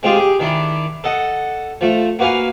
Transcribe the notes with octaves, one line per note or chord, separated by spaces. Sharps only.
G#3 C4 F4 G4 G#4
G4 G#4
D#3 D4 E4 B5
A4 D#5 F#5
F3 A3
A#3 F#4 B4 F5 G#5